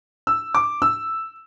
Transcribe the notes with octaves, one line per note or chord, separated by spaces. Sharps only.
E6
D6
E6